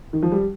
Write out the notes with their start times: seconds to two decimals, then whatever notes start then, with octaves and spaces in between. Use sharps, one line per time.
0.13 D#3
0.23 F3
0.32 G3